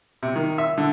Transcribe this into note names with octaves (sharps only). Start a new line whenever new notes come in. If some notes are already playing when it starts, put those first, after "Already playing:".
C3
D#3
E5
D3